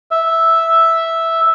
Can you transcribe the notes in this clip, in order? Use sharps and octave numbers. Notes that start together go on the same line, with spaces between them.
E5